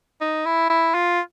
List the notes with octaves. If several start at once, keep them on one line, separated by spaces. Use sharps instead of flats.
D#4
E4
E4
F4